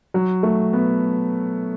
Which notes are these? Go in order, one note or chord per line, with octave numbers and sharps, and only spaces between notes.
F#3
A3
B3